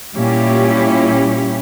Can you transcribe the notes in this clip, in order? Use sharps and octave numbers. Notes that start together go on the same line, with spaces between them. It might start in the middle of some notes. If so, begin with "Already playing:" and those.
A#2 G3 C#4 E4 G4